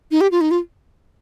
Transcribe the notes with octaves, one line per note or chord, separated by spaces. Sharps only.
D#4
G4
F4
D#4
F4